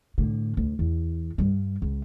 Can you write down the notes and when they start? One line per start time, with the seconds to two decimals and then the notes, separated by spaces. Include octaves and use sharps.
0.18 A2 D3
0.57 D2
0.79 E2
1.38 G2 G3
1.82 C#2